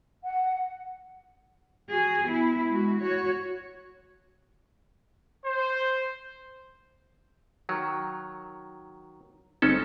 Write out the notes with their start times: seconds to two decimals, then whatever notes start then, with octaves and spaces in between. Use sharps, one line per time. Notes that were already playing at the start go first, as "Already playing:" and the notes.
0.24 F#5
1.90 F#4 G#4
2.25 B3 E4
2.70 G#3 F#4
3.00 F#4 C#5
5.44 C5
7.69 D#3 F#3
9.62 G1 G#3 C4 C#4 D#4 A4